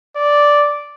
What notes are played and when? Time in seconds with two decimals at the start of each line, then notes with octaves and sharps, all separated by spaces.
0.16 D5